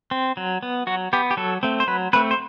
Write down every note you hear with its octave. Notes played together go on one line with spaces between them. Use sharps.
C4
F#3
B3
F#3 F#4
B3 G4
G4
F#3 A4
A3 C4
C5
F#3 B4
A3 C4 B4
C5